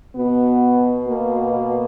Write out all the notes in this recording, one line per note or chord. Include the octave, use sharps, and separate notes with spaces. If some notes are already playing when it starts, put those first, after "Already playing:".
B2 B3
A#3